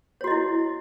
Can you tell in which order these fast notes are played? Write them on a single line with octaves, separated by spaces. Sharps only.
C#5 F#4 D#5 E4